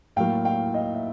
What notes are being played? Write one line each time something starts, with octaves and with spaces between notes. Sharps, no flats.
A2 F#3 A#3 F5 G5
F5 G5
D#5 F5
E5